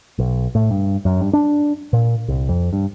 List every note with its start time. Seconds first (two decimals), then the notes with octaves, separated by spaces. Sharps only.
0.18 B1
0.55 A2
0.71 G2
1.05 F#2
1.21 G2
1.33 D4
1.93 A#2
2.28 C2
2.49 F2
2.73 G2